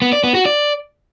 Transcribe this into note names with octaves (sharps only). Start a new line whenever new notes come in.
B3
D5
B3
F#4
D5